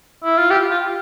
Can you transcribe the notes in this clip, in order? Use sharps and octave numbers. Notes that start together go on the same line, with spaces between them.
E4
F4
G4
F4